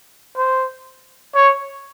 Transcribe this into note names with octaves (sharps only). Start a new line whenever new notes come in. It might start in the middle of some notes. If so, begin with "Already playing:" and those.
C5
C#5